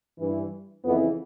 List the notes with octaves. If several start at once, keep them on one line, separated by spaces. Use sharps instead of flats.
G2 E3
F2 C#3 E3 B3